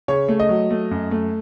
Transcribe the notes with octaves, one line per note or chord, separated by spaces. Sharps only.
C#3 C#5
A3
D#5
F#3
A3
F#2
A3